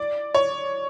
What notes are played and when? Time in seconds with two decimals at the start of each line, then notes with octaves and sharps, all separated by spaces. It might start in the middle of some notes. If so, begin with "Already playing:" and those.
Already playing: D5
0.35 C#5